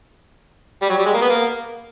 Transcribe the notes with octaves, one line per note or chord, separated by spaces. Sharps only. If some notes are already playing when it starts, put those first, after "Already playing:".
G3
F#3
G3
G#3
A#3
B3
A#3